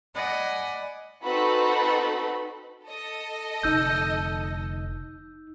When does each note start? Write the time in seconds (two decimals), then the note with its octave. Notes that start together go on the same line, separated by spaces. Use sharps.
0.14 D5 D#5 F#5 G#5 B5
1.22 C4 D#4 F#4 A4 B4 B5
2.84 A4 D#5
3.63 F1 D3 D#4 E6 G6